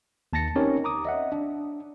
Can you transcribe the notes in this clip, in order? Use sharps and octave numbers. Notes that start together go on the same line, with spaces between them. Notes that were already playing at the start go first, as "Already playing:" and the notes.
D#2 A5 A6 A#6 C#7
C4 C#4 D#4 G4 A#4 C#5
A#5 D6 D#6
D#5 E5 F#5
D4